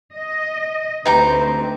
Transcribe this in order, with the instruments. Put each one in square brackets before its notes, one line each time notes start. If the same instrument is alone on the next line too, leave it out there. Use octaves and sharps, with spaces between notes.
[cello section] D#5
[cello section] D2 C4 [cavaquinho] D#4 G4 A#5 [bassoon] B4